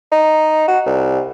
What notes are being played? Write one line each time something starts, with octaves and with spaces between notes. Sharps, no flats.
D#4
F#4
C2